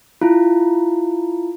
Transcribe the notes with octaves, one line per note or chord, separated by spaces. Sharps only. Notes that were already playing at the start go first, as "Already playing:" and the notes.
E4 F4